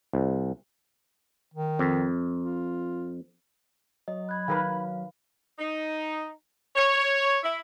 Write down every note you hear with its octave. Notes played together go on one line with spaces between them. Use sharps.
C2
D#3
F2
F4
F#3 D#5
B5 F#6 G#6
D#3 A#4 B4 F5
D#4
C#5
E4